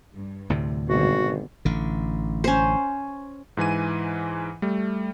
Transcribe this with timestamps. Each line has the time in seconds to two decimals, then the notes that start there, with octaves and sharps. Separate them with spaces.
0.14 G2
0.50 D2 A2 C3
0.89 G#1 B2 D3 G3 F#4
1.65 A1 D3
2.44 C#4 C5
3.57 G#2 E3 G#5 D#7
4.62 G3 A3